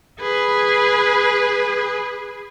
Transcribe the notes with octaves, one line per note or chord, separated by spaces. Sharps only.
G#4 B4